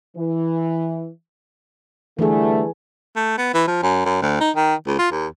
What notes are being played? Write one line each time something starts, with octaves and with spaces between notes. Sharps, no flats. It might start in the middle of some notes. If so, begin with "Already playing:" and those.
E3
D3 E3 G3 A3 G#4
A3
B3
E3
F3
F#2
F#2
D2
D#4
D#3
C#2
F4
D#2